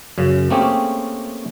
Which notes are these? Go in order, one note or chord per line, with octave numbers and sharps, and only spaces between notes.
F#2 C#3
A3 A#3 C4 C#4 G4 G#4